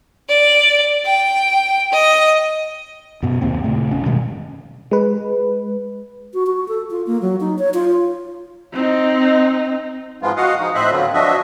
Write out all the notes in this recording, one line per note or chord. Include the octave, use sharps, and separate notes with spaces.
D5
G5
D#5
F#2 B2 B3
D#2 C3 A#3 C4
A#2 C#3 A3
E1 C#4
G2 B2 D#3 G#3
G#3 B4
F#4
F#4
A4
F4
A#3
F#3
D#4
C#5
F4
C4 D#4
G#2 E3 F3 G#3 B3 F4
F#4 D#5 F5 F#5
F3 G#3 D#4
A2 C4 C5 D#5 E5 F#6
D3 F3 F#3 B3 C4 F4
F3 F#3 D4 F#4 D#5 E5